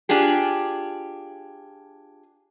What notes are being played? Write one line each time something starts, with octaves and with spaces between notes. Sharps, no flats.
D4 F4 G4 G#4